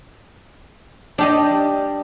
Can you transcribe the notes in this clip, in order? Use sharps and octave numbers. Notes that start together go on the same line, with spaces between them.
G3 D4 G4 D#5